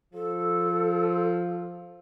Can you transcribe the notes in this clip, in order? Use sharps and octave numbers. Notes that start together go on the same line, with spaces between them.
F3 A4